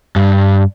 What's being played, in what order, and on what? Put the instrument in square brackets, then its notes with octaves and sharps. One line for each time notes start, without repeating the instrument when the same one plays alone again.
[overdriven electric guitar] G2